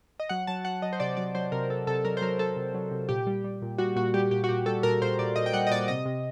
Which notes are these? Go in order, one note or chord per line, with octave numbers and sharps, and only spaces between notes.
D#5
F#3 F#5
F#3 A5
F#3 F#5
F#3 D#5
C5
C3 D5
F#3 D5
F#3 C5
C3 A#4
C3 A4
C3 A4
F#3 A#4
C5
F#3 A#4
F#3 A4
C3
F#3
C3
A#2 G4
G3
G3
A#2
G3 F#4
A#2 F#4
G3 G4
A#2 G4
F#4
A#2 G4
G3 A4
A#2 A#4
A#2 C5
A#2 D5
A#2 D#5
G5
G3 F#5
D#5
A#2 D5
C3 D#5
C3